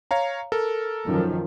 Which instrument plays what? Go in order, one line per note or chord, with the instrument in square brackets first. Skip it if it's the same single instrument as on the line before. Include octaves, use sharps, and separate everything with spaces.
[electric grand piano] C#5 F5 A#5
A4 A#4
[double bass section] F#2 D#3 F3